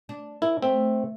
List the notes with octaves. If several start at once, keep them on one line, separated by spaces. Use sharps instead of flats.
D4
E4 A#4
A3 C4